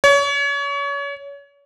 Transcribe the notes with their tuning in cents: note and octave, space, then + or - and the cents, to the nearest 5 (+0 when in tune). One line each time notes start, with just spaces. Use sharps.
C#5 +30